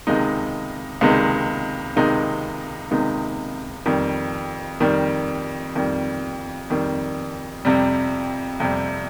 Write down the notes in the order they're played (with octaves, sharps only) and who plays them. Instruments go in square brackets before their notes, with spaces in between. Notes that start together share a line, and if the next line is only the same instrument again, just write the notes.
[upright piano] C#2 C3 D#3 G#3 D#4
C#2 C3 D#3 G#3 D#4
C#2 C3 D#3 G#3 D#4
C#2 C3 D#3 G#3 D#4
F2 D#3 G3
F2 D#3 G3
F2 D#3 G3
F2 D#3 G3
F2 C3 G3
F2 C3 G3